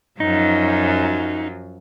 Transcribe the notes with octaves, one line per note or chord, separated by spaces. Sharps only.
F#2 F3 F#3 D#4